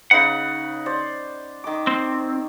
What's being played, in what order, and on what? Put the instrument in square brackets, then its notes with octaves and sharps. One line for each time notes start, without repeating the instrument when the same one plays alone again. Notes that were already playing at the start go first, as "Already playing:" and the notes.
[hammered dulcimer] C#3 D#4 B4 [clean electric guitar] F#5
[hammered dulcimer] C5 D5
D#3 D6
[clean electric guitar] C4